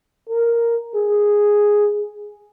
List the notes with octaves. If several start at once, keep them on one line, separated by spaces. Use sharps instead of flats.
A#4
G#4